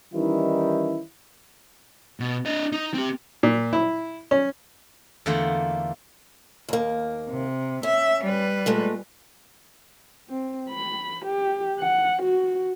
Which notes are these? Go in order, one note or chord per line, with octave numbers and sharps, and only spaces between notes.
D#3 E3 G3 C#4 D#4 E4
B2
D4 D#5
D#4
C4 G4
A#2
E4
C#4
E2 D3 A3 A#3 F4 F#5
D#2 A#3
C3
C#4 E5
G3 B4
A#2 G#3 A3
C4
B5
G4
F#5
F#4